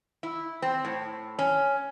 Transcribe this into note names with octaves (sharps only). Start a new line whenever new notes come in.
E4
C4
A2
C#4